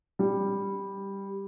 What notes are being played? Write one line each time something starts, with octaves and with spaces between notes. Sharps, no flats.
G3